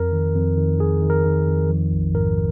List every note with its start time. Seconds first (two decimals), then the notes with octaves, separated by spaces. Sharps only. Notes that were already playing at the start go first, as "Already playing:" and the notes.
Already playing: F2 A#4
0.12 D#3
0.35 F2
0.57 D#3
0.79 F2 G#4
1.02 D#3
1.10 A#4
1.24 D#3
1.47 F2
1.70 F3
1.92 A#1
2.14 G#2 A#4